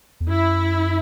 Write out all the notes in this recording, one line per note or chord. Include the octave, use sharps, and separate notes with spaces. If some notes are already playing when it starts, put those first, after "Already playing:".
E2
F#2 E4